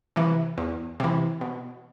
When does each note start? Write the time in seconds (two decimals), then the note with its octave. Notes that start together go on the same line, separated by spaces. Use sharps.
0.16 C3 E3
0.58 E2
1.00 C3 E3
1.41 B2